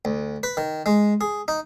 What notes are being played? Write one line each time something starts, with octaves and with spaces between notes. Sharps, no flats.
D2
B4
D#3
G#3
G#4
D#4